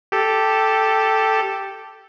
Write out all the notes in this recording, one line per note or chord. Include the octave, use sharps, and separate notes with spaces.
G4 A4